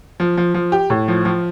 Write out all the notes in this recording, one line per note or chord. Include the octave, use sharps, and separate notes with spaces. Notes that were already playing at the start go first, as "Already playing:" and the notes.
F3
F3
F3
G4
A2
F3
F3